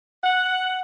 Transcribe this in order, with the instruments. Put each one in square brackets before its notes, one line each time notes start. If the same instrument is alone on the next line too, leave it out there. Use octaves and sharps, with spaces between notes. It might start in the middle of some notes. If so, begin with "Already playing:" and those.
[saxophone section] F#5